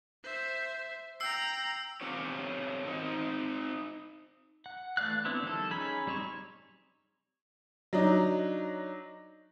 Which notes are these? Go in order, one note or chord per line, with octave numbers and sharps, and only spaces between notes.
C5 E5
G5 A#5 E6 C7
C4 C#4 F4 G4 C#5
C4 D#4
F#5
E3 A3 D5 F5 F#6
B3 C4 D4 E4
D#3 F3 G3 A4
C#4 D#4 G#4 G#5 B5
G3 C4 D#4 C#5
F#3 D4 D#4